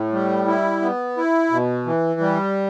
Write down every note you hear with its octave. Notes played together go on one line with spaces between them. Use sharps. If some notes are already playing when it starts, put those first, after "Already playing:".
Already playing: A2
G3
E4
B3
E4
B2
E3
G3